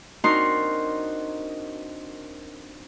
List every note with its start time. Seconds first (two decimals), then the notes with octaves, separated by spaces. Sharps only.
0.24 C4 D4 D#4 F#4 A#4 C6